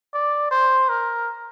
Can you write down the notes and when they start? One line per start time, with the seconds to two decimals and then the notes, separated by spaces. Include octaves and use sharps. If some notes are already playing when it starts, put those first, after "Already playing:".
0.13 D5
0.51 C5
0.89 A#4